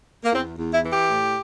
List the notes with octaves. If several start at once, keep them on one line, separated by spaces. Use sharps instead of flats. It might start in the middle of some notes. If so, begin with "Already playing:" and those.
A#3
E2 C4
E2
E4
E3
G4
A2